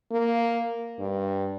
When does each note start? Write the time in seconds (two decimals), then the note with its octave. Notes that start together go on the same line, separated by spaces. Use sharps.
0.12 A#3
0.99 G2